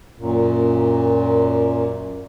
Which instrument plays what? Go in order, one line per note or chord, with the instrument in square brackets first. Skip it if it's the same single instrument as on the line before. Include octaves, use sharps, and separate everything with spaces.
[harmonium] F#2 A#2